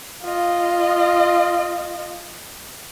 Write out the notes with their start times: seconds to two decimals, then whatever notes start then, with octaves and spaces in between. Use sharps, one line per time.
0.23 F4 D#5